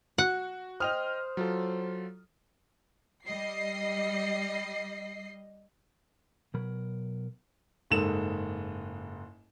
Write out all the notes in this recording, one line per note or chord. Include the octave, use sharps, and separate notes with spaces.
F#4 F#5
C5 D#5 G5 D#6 F6 F7
F#3 F4 A4
G3 D#5 C7
B2 F#3 A#4 B5
F#1 G#2 A4 E7